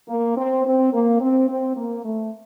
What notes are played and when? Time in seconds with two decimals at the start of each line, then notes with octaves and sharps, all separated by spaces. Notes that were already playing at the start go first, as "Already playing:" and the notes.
0.08 A#3
0.37 C4
0.65 C4
0.93 A#3
1.21 C4
1.49 C4
1.76 A#3
2.05 A3